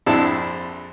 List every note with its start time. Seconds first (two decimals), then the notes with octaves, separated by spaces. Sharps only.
0.06 A#1 F2 C4 D4 E4 A5